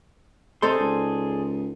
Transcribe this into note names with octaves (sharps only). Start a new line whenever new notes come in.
C3 D#4 G#4 A4 C5 D5 C6
C#2